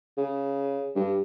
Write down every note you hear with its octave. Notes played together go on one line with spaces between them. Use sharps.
C#3
G2